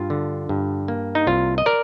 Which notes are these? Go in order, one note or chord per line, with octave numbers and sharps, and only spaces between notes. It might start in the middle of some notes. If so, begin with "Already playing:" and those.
Already playing: G2 F4
D3
G2
A#3
D#4
C2 F4
D#5
A#4 D5